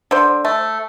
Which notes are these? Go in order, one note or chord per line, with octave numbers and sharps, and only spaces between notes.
D3 C5
A3